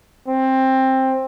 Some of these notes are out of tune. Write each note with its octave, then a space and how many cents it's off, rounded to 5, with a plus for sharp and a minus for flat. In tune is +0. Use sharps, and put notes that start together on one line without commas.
C4 +15